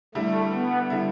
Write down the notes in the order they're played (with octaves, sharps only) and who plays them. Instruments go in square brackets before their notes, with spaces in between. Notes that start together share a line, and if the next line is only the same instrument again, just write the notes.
[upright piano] D3 G3 E4 [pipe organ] A3
[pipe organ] B3
[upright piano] D3 G3 E4